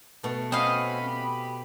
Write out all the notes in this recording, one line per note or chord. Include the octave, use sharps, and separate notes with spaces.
B2 A3
C4 C#4 F#4 D#5 F5 B5
G4